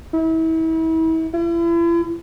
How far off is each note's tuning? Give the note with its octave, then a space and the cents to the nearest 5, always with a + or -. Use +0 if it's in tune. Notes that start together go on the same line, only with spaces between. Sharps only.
E4 -35
E4 +40